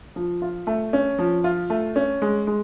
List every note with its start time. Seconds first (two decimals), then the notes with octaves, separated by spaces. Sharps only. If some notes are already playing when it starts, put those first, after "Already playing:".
0.16 F3
0.42 F4
0.67 A3
0.93 C#4
1.19 F3
1.44 F4
1.70 A3
1.96 C#4
2.22 G#3
2.47 G#3